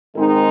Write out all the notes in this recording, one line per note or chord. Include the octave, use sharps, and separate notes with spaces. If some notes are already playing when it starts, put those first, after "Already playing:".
G#2 D#3 G#3 C4 D#4